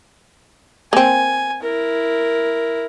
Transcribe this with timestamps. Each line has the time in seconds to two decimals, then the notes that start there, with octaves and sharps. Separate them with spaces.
0.93 A#3 C4 G#5
1.63 E4 A#4